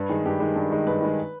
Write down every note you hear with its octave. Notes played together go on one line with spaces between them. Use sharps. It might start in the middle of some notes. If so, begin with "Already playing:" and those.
Already playing: G2 B4
D#3 G#3 G#4
G2 G4
D#3 G#3
G2
D#3 G#3
G2 B4
D#3 G#3